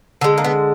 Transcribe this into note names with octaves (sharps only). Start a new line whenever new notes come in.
D3 G#3
A#3
B3